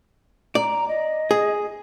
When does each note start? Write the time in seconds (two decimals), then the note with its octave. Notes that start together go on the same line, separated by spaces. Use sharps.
0.55 D5 A#5
0.88 D#5
1.31 G#4